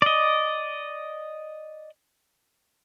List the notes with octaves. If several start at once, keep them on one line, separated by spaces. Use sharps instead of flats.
D5 D#5